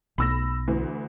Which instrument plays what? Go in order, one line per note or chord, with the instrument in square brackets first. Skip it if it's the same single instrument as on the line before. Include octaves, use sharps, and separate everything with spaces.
[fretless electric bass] B1 [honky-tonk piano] B5 E6 A#6
[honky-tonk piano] D2 E3